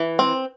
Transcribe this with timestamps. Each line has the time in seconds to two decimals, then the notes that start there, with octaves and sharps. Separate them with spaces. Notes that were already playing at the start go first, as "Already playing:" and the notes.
Already playing: E3
0.19 C4